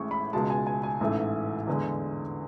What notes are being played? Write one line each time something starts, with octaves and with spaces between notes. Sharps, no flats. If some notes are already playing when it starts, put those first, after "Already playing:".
Already playing: A1 A2 G#3 C#6
B5
C#2 B2 G#3 A5
G#5
G#5
G#5
A1 G#2 E3 A3
E2 D3 G#3